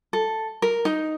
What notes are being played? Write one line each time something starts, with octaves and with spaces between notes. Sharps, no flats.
A4
A#4
D#4